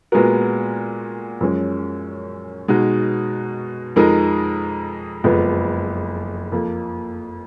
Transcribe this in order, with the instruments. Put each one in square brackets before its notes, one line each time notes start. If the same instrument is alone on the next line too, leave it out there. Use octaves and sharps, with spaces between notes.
[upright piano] A#2 G#3 B3 F#4 A#4
F#2 F3 G#3 C#4
B2 G#3 D#4 F#4
F2 F3 G#3 D#4 A#4
F#1 F2 F3 G#3 B3
F2 F3 A#3